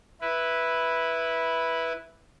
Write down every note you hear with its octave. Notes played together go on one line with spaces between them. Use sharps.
E4 B4